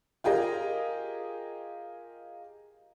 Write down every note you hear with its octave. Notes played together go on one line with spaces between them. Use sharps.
F4 G4 G#4 A#4 D#5